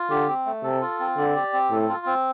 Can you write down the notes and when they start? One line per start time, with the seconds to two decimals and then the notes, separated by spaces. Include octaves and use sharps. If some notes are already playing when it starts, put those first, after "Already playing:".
Already playing: F4
0.10 D3 G4
0.28 C4
0.46 A3
0.64 C3 A4
0.82 F4
1.00 C4
1.18 D3 D5
1.36 G4
1.53 C4
1.71 A2 A4
1.89 F4
2.06 C4